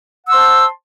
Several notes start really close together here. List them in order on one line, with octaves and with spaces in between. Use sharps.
F#5 E6 C6 C5 A5